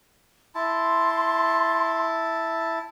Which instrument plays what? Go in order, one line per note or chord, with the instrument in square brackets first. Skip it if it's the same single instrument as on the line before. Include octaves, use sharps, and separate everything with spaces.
[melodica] E4 A5 [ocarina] C6